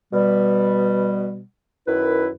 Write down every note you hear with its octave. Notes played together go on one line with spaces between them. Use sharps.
B2 G3
F#2 D#3 E4 B4